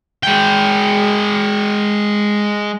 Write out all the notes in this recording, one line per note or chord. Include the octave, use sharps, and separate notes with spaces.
G#3 G5